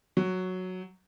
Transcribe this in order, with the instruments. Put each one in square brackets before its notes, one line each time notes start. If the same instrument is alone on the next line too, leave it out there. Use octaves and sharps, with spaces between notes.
[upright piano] F#3